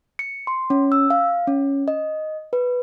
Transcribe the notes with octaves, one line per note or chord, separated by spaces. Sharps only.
C#7
C6
C#4
E6
F5
C#4
D#5
B4